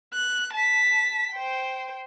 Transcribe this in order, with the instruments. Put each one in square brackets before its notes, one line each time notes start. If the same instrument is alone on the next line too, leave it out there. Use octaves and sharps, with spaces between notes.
[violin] F#6
A5 B6
C5 G5